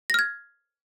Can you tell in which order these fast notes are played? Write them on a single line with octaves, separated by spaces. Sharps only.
A#6 F6 G#6